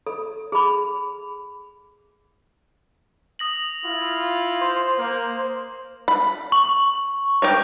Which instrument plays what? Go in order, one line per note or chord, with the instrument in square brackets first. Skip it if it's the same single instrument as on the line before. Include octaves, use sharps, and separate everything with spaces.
[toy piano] A4
G#4 B5
[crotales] D#6 A#6 F#7
[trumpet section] E4 F4
[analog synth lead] C5
[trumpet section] A#3
[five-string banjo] B5
[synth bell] C#6
[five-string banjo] G4 A#4 C#5